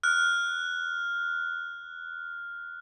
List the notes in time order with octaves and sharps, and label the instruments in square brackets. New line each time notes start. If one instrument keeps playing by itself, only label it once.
[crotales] F6 F#6